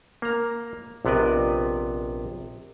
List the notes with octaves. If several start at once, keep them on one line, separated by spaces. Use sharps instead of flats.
A#3 A#5
A#1 C3 B3 D5 D#5